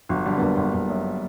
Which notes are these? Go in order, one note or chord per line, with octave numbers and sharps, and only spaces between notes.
G1 F#3
D3 G3
B3
G1 A#3
G1
G1
F#2